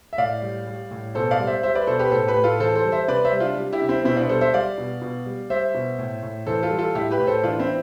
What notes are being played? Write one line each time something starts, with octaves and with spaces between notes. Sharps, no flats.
E5
A2 D5 F5
G3
G3
A2
B2 A4 C5
D5 F5
G3
C5 E5
G3 C5 E5
B4 D5
B2 A4 C5
G4 B4
A2 A4 C5
G4 B4
A2
F4 A4
E3 A4 C5
A4 C5
G3
C5 E5
C3 B4 D5
C5 E5
G3
D4 F4
G3
E4 G4
C3
C4 E4
B2 C4 E4
B3 D4
G3 A4 C5
C5 E5
G3 D5 F5
B2
B2
G3
G3 C5 E5
B2
A2
A2
E3 A4 C5
F4 A4
G3
F4 A4
A2 E4 G4
G4 B4
A2
A4 C5
E3 D4 F4
C4 E4